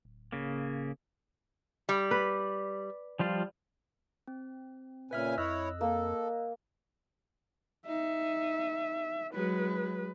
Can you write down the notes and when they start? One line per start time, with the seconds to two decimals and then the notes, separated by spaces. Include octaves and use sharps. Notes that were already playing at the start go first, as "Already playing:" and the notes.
0.05 D1
0.32 C#3 A#3
1.89 G3
2.11 B4
3.19 F3 G3 F4
4.27 C4
5.11 A#2 C#3 B4 E5 G#5 F6
5.38 F2 E4 C#5 D#5 E6 F#6
5.81 A#3 A4
7.87 D#4 E5
9.34 F#3 G#3 B4